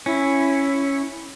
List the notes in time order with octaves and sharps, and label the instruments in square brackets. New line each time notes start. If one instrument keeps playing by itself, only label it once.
[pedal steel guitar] C#4 [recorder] E4